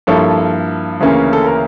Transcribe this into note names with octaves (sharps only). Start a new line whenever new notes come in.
G2 F3 A#3 E4 A4 C#5
D2 C#3 E3 A#3 C#4
A4
A#4